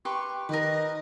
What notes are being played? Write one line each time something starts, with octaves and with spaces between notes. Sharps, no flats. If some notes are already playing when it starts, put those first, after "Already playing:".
G4 B4 C6 C#6
D#3 A#4 B4 D#5